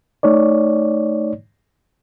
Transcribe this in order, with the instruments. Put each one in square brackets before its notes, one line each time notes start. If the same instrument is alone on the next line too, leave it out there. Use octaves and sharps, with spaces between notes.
[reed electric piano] A3 D#4 C#5 D5